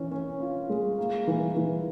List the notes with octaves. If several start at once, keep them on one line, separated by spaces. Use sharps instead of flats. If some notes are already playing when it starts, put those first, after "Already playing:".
Already playing: E3 C#4
C#4
F4
G#3
A#3
E3
E3